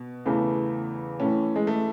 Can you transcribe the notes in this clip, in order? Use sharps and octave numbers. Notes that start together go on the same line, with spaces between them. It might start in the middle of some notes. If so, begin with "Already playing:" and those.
Already playing: B2
E2 C#3 E3 A3
A2 E3 A3 C#4
G#3
A3